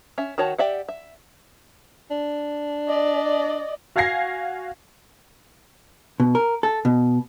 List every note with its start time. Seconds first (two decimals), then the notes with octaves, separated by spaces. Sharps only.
0.18 C#4 E5
0.38 D#3 F#4 C#5 F#5 A5
0.58 G4 D5 E5 F#5
0.89 E5
2.11 D4
2.88 D5 D#5
3.96 F#4 F5 G#5 G#6 A#6 C7
6.20 B2
6.35 A#4
6.63 A4
6.85 B2